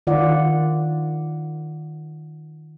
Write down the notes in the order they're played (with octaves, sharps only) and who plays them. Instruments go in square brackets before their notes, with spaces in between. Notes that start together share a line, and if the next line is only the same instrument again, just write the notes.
[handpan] D#3 F4 D5 F#5